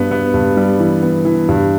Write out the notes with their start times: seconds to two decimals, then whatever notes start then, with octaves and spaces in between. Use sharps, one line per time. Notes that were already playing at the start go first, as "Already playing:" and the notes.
Already playing: G2 B3
0.11 B3
0.34 G2
0.57 G3
0.80 E3
1.02 B3
1.25 E3
1.49 G2